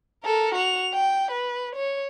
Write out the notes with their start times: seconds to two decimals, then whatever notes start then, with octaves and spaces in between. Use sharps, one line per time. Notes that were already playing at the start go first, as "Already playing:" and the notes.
0.24 A4 A#4
0.55 F#4 F7
0.93 G5
1.31 B4
1.75 C#5